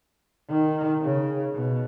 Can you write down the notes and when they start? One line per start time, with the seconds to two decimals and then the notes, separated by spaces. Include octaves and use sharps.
0.49 D#3
1.02 C#3
1.54 B2